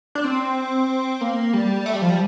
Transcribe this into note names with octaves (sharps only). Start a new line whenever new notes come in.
D4
C4
A#3
G3
A3
G3
F3
G3